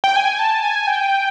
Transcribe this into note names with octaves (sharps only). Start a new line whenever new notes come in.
G5
G#5
A5
G#5
G5